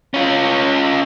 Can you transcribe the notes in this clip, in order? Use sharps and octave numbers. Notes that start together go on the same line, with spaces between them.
C#4 F4